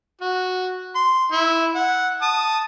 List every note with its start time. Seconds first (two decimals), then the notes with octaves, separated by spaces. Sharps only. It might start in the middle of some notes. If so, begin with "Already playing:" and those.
0.21 F#4
0.95 C6
1.32 E4
1.75 F#5
2.22 A5 D#6